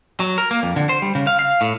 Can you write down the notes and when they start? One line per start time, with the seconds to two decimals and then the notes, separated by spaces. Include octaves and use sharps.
0.20 F#3
0.38 A#4
0.51 A#3
0.63 F2
0.76 D3
0.89 C5
1.02 G3
1.15 C#3
1.27 F5
1.39 F5
1.61 A2